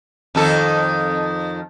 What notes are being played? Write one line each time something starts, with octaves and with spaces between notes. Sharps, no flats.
F2 D#3 A4